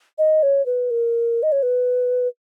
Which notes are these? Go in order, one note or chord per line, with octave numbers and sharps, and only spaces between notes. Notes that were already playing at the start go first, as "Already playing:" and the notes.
D#5
C#5
B4
A#4
D#5
C#5
B4